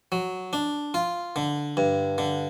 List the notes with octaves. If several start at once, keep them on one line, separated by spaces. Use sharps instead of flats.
F#3
D4
F4
D3
G2
D3